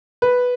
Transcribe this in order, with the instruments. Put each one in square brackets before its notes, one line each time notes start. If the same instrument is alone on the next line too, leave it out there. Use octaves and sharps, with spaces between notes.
[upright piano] B4